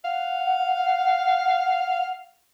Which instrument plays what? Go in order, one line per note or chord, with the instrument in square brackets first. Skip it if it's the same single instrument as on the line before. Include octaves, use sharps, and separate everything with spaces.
[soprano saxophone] F5 [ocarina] F#5